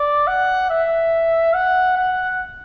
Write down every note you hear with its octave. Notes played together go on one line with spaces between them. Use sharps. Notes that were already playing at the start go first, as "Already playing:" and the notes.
Already playing: D5
F#5
E5
F#5
F#5